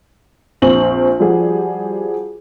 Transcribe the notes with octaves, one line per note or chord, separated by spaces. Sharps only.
A#1 C4 C#6 F#7
F3 G3 F#4 G#4